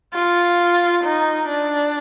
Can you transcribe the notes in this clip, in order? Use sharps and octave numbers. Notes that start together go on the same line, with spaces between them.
F4
D#4
D4